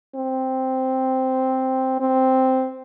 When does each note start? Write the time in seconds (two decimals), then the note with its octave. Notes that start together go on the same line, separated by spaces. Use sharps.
0.16 C4
2.00 C4